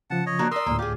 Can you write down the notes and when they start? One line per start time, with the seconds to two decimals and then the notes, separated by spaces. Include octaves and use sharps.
0.10 C#3 F3 F#5 A5
0.26 C#5 D#5
0.39 A#3 D4 F#4
0.51 A#4 D5 C6 D#6 E6
0.66 D2 A2 A#3
0.79 F4 G4 G#4